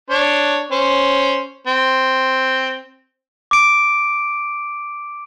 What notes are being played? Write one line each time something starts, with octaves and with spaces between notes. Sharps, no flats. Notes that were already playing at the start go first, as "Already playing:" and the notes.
D4 C#5
C#4 C5
C4
D6 D7